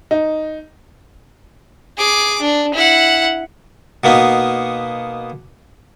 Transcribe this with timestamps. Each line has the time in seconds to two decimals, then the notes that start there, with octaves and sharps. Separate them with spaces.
0.11 D#4
1.98 G#4 D6
2.41 D4
2.74 E4 F#5
4.04 B2 A#3 B3 D#4